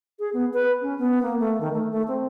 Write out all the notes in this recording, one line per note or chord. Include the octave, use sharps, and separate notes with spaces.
G#4
B3
B4
C#4
B3
A#3
A3
D#3
A3
A3
C4